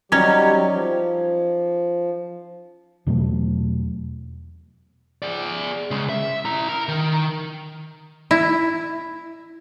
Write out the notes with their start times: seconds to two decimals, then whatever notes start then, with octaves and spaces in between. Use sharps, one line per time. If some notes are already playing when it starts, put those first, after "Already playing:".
0.12 F#3 G3 C#4 D#4 G4 C#5
0.71 F3
3.07 E2 B2 F#3 A3
5.22 G#4 D5
5.91 C#3 G#3
6.09 E5
6.45 E4 A#5
6.69 A#4 A#5
6.89 D#3
8.31 E4